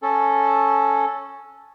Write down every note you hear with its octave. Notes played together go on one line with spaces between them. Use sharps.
C#4 A4